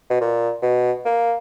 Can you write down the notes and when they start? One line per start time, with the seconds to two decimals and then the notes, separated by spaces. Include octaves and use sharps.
0.10 B2
0.21 A#2
0.62 B2
1.05 A#3